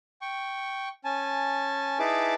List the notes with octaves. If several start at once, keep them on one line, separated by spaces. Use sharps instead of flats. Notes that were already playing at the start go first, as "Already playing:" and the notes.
G5 C#6
C#4 G#5 A5
D#4 E4 G#4 B4 A5 D6